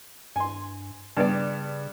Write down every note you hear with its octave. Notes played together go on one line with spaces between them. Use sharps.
G2 G#5 C6
G2 C#3 B3 D5